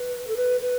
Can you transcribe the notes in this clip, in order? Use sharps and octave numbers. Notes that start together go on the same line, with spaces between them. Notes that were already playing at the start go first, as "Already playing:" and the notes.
Already playing: B4
A4
B4
B4